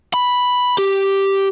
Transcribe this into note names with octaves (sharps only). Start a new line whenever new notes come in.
B5
G4